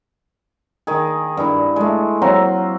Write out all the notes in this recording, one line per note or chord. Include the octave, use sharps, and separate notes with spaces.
D#3 G#4
G2 E4
G#3 A3
F#3 C4 F5 A#5